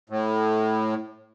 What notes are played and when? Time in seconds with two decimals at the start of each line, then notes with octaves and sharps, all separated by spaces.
0.10 A2